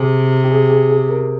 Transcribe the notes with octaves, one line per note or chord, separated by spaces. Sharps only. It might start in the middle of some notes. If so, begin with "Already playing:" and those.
Already playing: C3 G#4
G4
G#4
G#4
G#4
A#4